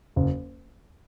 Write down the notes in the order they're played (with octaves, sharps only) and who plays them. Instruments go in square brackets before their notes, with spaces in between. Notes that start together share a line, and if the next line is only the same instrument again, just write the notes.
[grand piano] F#1